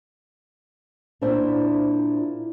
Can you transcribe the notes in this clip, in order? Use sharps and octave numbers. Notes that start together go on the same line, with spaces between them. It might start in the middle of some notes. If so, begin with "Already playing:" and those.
A#2 D4 E4 C5 D5 E5